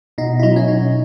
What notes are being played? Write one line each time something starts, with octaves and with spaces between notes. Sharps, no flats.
B2 D#4
E4
F#3 D#4
C#4
B2 D#4